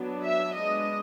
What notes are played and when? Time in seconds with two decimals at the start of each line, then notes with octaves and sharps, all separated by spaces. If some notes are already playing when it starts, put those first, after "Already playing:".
Already playing: F#3 B3 D4
0.23 E5
0.55 G#3 B3 D4 D#5